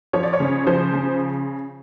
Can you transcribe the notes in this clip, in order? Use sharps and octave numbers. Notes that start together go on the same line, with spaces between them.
F3 C#5
D5
C#5
C#3
F3 C5
C#3